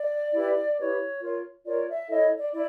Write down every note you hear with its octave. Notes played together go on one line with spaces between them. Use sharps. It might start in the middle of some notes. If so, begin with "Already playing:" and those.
Already playing: D5
E4 G4 B4
E4 G4 B4 C#5
F4 A#4 C#5
F4 A#4 C#5 D5
E5
E4 A4 C#5 D#5
D5
E4 D5